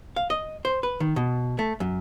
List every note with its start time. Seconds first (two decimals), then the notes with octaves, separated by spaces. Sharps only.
0.16 F5
0.30 D#5
0.65 C5
0.83 B4
1.00 D#3
1.16 B2
1.59 A3
1.80 F#2